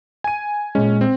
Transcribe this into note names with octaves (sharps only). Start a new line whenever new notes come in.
G#5 D#7
A#2 G#3 C#4
C4